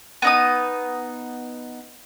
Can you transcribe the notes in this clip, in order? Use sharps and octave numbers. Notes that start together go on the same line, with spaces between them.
B3 D#4 D#6